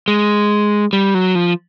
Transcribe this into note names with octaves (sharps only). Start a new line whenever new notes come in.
G#3
G3
F#3
F3